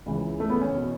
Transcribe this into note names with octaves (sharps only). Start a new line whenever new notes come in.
C#2 C#3 E3
A3
B3
C#4
E2 B2